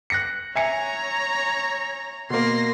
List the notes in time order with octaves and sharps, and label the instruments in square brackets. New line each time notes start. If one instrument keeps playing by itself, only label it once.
[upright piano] F#6 A#6 C#7
[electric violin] C#5 A#5 [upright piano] E5 G#5 C#7
[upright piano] B2 A#3 [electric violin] C6 A#6